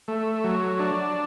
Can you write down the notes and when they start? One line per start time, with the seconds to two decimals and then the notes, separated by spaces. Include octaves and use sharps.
0.08 A3
0.44 F#3
0.79 D4